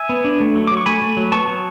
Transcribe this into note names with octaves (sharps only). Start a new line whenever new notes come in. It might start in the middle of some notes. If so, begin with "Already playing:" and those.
Already playing: E5 G#5
B3
D4
A3
F#3
F#3 D6
C#6
A3 G#5 B5
A3
F#3
B3 A5 C#6
F#3